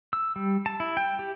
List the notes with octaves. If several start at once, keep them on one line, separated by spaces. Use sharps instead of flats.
E6
G3
A5
E4
G5
G4